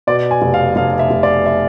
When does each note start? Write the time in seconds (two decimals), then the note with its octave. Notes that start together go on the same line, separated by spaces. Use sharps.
0.07 B2 D5
0.31 G#5
0.42 F1
0.54 F5
0.76 F1 F5
0.99 E5
1.11 F1
1.23 D5
1.46 E5